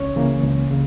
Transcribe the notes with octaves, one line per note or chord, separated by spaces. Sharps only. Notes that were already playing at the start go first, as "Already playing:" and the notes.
Already playing: C#2 C#4 C#5
C#3 E3 A#3
C#2
C#3